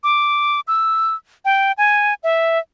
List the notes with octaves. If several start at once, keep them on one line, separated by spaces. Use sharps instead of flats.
D6
E6
G5
G#5
E5